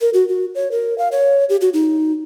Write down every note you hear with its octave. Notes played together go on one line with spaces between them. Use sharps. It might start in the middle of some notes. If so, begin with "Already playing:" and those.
A#4
F#4
F#4
C#5
A#4
F5
C#5
G4
F#4
D#4